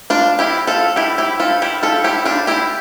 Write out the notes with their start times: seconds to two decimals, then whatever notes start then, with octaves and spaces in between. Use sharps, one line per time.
0.10 D4 F4
0.39 E4 G4
0.67 F4 A4
0.96 E4 G4
1.18 E4 G4
1.40 F4 A4
1.62 E4 G4
1.83 F4 A4
2.04 E4 G4
2.25 D4 F4
2.47 E4 G4